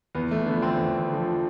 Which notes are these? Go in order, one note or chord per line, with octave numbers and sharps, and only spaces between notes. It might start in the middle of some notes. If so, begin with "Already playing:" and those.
E2 B3
A3
D3 F3 B3
C4
E2
D3 F3